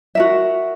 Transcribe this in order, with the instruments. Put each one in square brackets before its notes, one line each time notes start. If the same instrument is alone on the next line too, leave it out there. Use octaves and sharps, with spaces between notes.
[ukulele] F#4 A#4 E5